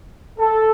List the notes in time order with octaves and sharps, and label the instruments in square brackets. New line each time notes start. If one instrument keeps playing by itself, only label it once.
[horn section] A4